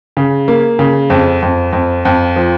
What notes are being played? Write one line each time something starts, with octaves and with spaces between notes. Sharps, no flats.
C#3
A#3
C#3
F2
F2
F2
F2
F3